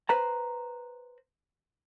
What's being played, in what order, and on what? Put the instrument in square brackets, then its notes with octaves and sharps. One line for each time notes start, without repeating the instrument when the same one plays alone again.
[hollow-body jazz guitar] B4 C5 A#5